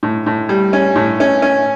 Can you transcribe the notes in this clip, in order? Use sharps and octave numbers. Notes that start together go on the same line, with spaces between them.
A2
A2
G3
C#4
A2
C#4
C#4